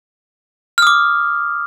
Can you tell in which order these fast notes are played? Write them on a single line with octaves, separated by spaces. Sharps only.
F6 D#6 D6